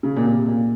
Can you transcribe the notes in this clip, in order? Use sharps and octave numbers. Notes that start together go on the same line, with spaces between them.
C#3
A#2
C3
A#2